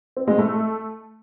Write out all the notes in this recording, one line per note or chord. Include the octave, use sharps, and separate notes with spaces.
C4
G#3
A3